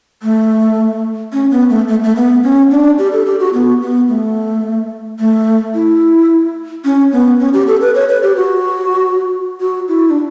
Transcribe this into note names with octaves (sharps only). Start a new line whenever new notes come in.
A3
C#4
B3
A3
A3
A3
B3
C#4
D4
G4
A4
G4
F#4
B3
B3
A3
A3
E4
C#4
B3
C#4
G4
A4
B4
C#5
B4
G4
F#4
F#4
E4
D4